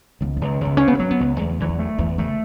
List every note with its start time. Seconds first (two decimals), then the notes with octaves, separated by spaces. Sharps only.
0.21 C#2 B3
0.37 C#2 B3
0.61 C#2 B3
0.77 C#3 C#4
0.88 B3
0.99 F#3 C#4
1.11 B3
1.20 C#2
1.40 E2 A3
1.60 E2 E3
1.69 F#3
1.79 A3
1.98 E2 E3
2.18 C#3 A3